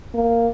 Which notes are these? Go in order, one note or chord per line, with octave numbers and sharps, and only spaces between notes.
A#3